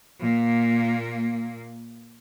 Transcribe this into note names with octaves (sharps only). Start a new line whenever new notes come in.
A#2 A#3